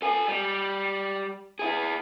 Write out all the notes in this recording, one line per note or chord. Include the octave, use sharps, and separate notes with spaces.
A4 G#5
G3
E4 G#4